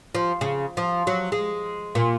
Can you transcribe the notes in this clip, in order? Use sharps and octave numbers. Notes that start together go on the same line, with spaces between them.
F3
C#3
F3
F#3
G#3
A#2